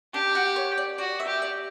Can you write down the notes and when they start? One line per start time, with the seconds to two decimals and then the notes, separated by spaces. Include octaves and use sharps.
0.14 D4 G4
0.35 F#4
0.56 C#5
0.77 D5
0.98 F#4 D5
1.20 E5
1.27 G4
1.42 D5